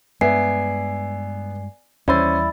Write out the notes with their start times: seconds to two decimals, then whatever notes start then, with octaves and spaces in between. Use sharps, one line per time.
0.21 G2 G#3 B3 D5 E5 G#5 C7
2.08 D#2 E3 G3 C#4 E4 C5 D5 A6